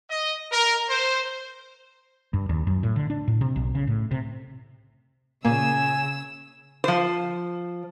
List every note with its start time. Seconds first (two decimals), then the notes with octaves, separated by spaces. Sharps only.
0.11 D#5
0.52 A#4
0.89 C5
2.34 G2
2.49 D#2
2.67 F#2
2.83 A2
2.96 D3
3.10 D4
3.28 A2
3.41 C3
3.56 B1
3.75 C#3
3.87 A2
4.11 C3
5.45 A#2 C#3 A#3 G#5 E6 E7
6.84 F3 C5